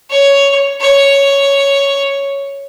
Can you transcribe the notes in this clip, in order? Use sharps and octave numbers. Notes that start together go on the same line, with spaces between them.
C#5
C#5